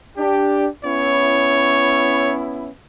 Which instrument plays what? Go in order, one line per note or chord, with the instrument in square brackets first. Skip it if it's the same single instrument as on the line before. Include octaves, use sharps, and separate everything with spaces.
[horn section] D4 G4
[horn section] B3 C#4 E4 [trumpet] C#5